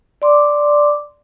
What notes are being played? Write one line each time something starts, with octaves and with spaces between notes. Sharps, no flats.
D5 C6 D6